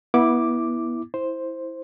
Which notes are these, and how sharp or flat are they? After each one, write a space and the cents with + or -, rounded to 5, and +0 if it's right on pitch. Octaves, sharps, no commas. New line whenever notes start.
B3 -25 E4 -10 D6 +0
E4 -10 C5 +5